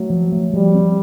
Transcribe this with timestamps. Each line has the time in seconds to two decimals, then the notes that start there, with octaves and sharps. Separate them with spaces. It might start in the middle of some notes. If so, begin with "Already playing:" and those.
Already playing: F#3 A3
0.10 F3
0.32 A3
0.53 F3 G3
0.74 C4